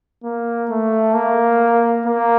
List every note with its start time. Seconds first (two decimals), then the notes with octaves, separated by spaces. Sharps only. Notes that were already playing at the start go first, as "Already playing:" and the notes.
0.24 A#3
0.70 A3
1.14 A#3
2.06 A#3